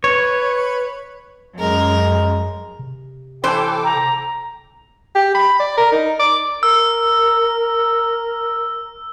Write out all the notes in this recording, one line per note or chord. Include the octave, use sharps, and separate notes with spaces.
B4 C#5
F#2 G#3 A#4
C3
E3 A4 C5 G5 D6
A#5
G4
B5
D5
A#4
D#4
D6
A#4 E6